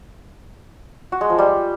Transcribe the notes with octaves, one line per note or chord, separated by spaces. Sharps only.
F#4
G#3
F3
G3